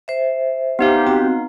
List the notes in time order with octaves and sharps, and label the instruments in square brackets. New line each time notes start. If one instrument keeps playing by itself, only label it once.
[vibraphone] C5 E5
[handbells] B3 D#4 F5 [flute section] G4
[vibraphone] C4 F#4